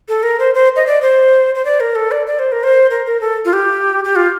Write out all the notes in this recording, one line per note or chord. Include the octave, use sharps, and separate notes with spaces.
A4
A#4
C5
C5
D#5
D5
C5
C5
D5
A#4
A4
D5
D5
C5
A#4
C5
A#4
A#4
A4
F4
G4
G4
F4